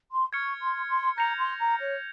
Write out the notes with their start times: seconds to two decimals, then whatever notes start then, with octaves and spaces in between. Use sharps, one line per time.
0.11 C6
0.33 C#6 F6 G#6 C#7
0.61 C6
0.89 C6
1.17 A#5 G6 A#6 C#7 F7
1.38 C6
1.60 A#5
1.80 C#5